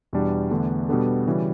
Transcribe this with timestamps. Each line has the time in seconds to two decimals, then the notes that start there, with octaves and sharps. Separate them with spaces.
0.13 E2 B2 G3 D4
0.51 E2 D3 A3 D4
0.89 B2 G3 B3 D4 A4
1.27 C#3 E3 G3 C#4 F#4